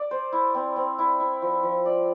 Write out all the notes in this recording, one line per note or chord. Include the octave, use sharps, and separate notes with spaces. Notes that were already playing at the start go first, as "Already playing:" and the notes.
Already playing: D5
C5
E4
C4
C4
E4
E4
F3
F3
D5